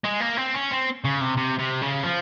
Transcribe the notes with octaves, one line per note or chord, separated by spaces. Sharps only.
G#3
A#3
C4
C#4
C4
C#3
C3
C3
C3
C#3
F3